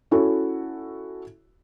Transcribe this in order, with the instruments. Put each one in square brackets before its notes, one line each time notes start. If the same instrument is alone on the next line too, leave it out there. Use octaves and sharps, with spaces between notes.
[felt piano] C#4 E4 F#4 A4